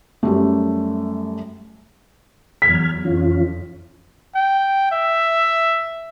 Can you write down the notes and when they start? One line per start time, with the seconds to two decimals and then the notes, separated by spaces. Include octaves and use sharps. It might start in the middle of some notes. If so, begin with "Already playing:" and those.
0.23 F#2 G3 A3
2.62 E2 F#3 F6 G#6 B6
3.05 F2 E3 C#4 F4
4.35 G5
4.92 E5